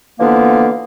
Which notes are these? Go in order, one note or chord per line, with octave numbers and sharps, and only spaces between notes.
D3 E3 F3 A#3 B3